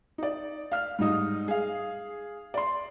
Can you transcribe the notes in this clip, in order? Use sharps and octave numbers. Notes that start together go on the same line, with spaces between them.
D#4 D5
F5 F6
G#2 G3 D#4 D#6
G#4 F5
D5 C6